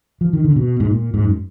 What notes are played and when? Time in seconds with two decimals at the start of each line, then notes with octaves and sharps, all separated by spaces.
0.21 F3
0.33 D#3
0.44 D3
0.56 B2
0.80 G#2
0.91 A#2
1.14 G#2
1.24 F#2